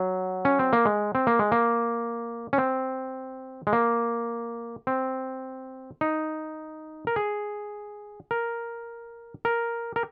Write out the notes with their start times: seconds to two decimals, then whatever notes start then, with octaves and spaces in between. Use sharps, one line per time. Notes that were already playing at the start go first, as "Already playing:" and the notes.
Already playing: F#3
0.45 C#4
0.59 C4
0.73 A#3
0.85 G#3
1.15 C4
1.27 A#3
1.39 G#3
1.52 A#3
2.53 C#4
2.58 C4
3.67 G#3
3.73 A#3
4.87 C4
6.01 D#4
7.07 A#4
7.16 G#4
8.31 A#4
9.45 A#4
9.96 A#4